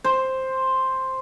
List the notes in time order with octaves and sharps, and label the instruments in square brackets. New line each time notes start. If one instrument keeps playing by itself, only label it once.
[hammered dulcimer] C5